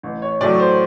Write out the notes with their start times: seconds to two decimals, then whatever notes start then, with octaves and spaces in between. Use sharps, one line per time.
0.03 A1
0.22 C#5
0.41 A2 F#3 A3 D5
0.60 C5